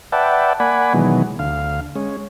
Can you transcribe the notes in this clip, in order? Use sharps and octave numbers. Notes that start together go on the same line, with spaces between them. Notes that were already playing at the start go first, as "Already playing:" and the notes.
B4 D5 E5 F#5 G5 A5
A#3 D5 F#5 G#5 B5
B2 D#3 E3 F#3 G#3 B3
D2 F5
G#3 C#4